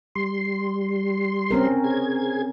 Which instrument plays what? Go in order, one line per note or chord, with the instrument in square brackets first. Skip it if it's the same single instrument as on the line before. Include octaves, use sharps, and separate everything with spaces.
[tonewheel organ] G3 C6
[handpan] C4 C#4 A#4
[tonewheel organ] G#4 G#6